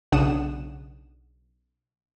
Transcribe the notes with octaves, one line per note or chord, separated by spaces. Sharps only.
B1 C#3 D4 F#5 D#6 E7